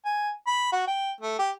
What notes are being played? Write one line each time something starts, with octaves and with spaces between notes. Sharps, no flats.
G#5
B5
F#4
G5
A3
G4